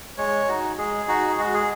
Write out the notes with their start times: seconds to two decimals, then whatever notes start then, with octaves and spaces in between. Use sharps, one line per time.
0.18 G#3 C#5
0.48 D#4 F#4
0.78 G#3 G#4
1.08 D#4 F#4
1.38 G#3 F#4
1.54 G#4